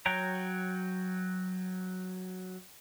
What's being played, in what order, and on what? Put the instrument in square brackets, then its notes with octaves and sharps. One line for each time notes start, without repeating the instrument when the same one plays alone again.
[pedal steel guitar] F#3 F#4 C#5 G5 A#5